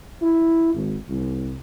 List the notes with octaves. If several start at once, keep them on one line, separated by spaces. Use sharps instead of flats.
E4
G#1
C2